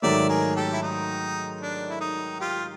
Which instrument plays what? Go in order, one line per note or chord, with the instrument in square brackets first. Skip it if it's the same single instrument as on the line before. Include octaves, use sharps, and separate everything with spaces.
[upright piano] G#2 D#3 F#3 A3 [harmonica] D5 E5
[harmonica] G#4 A#4
G4 A4
E4
D#4
D4
E4
D#4
F4 G4